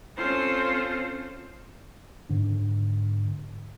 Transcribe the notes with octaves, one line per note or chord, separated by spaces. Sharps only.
C4 C#4 F4 A4 C5
G#2 D3 D4